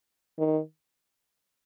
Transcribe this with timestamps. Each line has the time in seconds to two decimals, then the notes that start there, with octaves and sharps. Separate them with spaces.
0.39 D#3